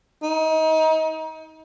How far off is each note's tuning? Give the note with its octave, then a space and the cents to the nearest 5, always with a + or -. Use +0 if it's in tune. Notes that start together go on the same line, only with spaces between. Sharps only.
D#4 +30